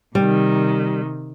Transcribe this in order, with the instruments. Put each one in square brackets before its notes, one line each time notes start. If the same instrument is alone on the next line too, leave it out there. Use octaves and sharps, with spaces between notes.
[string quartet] C3 D#3 [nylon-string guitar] G3